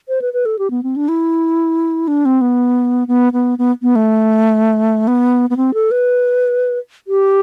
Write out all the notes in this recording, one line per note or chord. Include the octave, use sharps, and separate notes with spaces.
C5
B4
B4
A4
G4
B3
C4
D4
E4
D4
C4
B3
B3
B3
B3
B3
A3
B3
B3
C4
A4
B4
G4